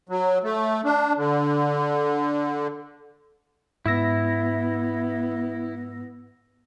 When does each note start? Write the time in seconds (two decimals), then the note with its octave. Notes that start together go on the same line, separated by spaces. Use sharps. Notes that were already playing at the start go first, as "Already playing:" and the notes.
0.09 F#3
0.44 A3
0.85 D4
1.17 D3
3.86 G#2 B3 E4 E6 A#6